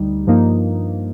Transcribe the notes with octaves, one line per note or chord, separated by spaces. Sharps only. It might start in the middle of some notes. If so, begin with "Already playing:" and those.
Already playing: D2 G3 D#4
G2 F3 A#3 D#4